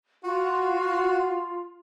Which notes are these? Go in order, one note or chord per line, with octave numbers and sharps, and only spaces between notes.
F4 F#4